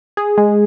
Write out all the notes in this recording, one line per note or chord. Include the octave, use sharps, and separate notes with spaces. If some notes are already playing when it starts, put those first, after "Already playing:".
G#4
G#3